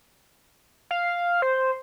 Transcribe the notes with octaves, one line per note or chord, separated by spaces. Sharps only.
F5
C5